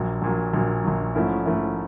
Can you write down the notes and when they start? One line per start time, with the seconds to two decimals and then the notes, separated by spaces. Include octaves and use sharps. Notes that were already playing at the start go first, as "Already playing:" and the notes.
Already playing: A#1 A#2 F#3
0.22 A#1 A#2 F#3
0.54 A#1 A#2 F#3
0.84 A#1 A#2 F#3
1.15 G#2 F3 A3 C#4 E4
1.46 G#2 F3 A3 C#4 E4